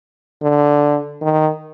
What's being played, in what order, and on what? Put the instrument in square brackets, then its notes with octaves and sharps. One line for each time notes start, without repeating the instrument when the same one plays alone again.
[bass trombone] D3
D#3